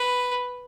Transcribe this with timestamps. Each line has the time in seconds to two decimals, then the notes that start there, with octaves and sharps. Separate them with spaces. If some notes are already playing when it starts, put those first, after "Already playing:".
Already playing: B4